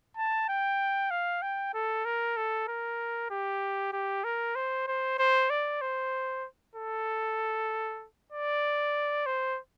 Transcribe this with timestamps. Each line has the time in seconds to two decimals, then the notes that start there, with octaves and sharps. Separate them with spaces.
0.17 A5
0.49 G5
1.11 F5
1.42 G5
1.74 A4
2.05 A#4
2.37 A4
2.68 A#4
3.31 G4
3.93 G4
4.25 A#4
4.56 C5
4.87 C5
5.19 C5
5.50 D5
5.82 C5
6.75 A4
8.32 D5
9.26 C5